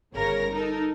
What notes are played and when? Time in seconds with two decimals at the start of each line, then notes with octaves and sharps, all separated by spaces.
0.14 G1 C#3 A#4 C#5 A#6
0.52 D#4 A4 A#4